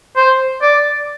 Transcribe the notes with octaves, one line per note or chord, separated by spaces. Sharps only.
C5
D5